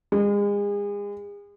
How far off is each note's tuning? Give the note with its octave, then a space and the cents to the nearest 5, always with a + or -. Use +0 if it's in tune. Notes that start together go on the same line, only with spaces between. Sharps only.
G#3 -35